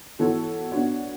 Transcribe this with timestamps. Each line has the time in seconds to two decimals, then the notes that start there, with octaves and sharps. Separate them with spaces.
0.19 E3 B3 F#4 A4 C#5
0.72 B3 D4 F#4 C#5